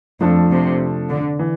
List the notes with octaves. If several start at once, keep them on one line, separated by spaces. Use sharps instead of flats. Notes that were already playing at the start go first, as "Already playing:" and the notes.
F2 F3 A3 D4 A4
C3
D3
E3